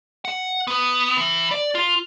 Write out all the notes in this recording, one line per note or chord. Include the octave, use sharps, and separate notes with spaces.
F#5
B3
E3
D5
F4